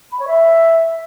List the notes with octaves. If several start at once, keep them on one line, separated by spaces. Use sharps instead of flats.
B5
C#5
E5